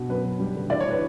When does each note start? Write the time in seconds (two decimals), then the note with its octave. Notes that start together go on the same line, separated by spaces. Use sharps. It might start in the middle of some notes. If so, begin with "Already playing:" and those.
Already playing: B2
0.09 F#2 B4
0.25 F#2
0.40 G3
0.56 D3
0.70 E3 D5
0.80 C#5
0.85 E3 B4